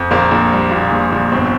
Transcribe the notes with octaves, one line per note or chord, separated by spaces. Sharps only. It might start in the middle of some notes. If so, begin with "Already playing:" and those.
Already playing: F2
A#1 A#3
A#1
G3
A#2
A#1
A#1
G1 C4